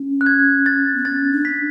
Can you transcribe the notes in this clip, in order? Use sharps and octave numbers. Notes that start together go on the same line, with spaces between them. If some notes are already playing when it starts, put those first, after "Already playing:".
Already playing: C#4
F#6
G#6
A6
B3
C#4 A6
D4
B6